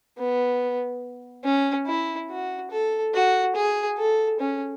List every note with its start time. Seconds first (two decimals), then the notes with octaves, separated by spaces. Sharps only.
0.18 B3
1.44 C#4
1.87 E4
2.30 F#4
2.72 A4
3.14 F#4
3.55 G#4
3.98 A4
4.40 C#4